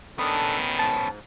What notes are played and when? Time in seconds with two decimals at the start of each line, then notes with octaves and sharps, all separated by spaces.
0.19 D#3 B3 C#4 D4 A4 D#6
0.79 G#2 A5